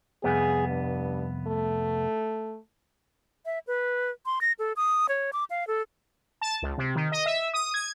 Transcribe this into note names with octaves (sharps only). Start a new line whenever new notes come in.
C2 F2 B3 G#4
G2
A3
E5
B4
C6
A#6
A4
D#6
C#5
D6
F5
A4
A5
C#2
C3
D#3
D#5
E5
D#6
G#6